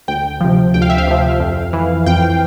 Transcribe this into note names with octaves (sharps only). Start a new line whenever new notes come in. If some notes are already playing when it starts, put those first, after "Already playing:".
D2 G5
C3 F3
D2 G5
F5
E5
F5
C3 F3
F2
E3
F2 G5